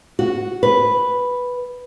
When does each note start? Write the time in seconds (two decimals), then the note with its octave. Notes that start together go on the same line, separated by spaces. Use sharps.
0.19 F#4
0.63 B4